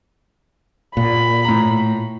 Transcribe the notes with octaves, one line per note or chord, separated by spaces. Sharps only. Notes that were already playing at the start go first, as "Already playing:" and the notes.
A#2 B5
A2 A#5